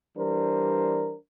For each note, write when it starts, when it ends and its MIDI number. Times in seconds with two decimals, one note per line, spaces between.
0.17 1.16 52
0.17 1.16 55
0.17 1.16 62
0.17 1.16 70
0.17 1.16 72